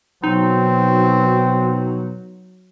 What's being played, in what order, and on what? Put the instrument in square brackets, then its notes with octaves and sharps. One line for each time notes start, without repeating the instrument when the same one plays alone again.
[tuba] B2 [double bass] F#3 [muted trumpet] C4 [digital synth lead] D#4